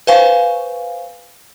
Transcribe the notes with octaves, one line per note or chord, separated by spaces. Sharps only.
B4 C5 F5 G#5 C#6